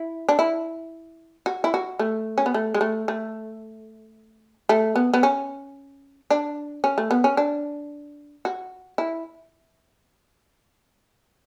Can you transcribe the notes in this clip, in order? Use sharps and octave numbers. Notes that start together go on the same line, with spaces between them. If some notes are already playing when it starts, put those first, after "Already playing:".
Already playing: E4
D4
E4
F#4
E4
F#4
A3
C#4
B3
A3
G#3
A3
A3
A3
B3
B3
C#4
D4
C#4
A3
B3
C#4
D4
F#4
E4